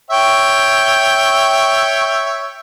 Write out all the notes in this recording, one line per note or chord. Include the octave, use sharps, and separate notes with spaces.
C#5 E5 G5